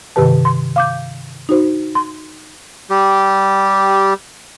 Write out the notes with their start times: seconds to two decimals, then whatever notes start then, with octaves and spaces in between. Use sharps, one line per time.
0.16 G2 C3 D#3 G4 B4 A5
0.45 C6
0.76 F5 D6 G6
1.49 D#4 F#4 C5
1.95 C6
2.90 G3 G4